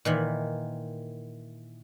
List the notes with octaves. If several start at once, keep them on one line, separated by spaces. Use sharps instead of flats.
A#2 D#3 E3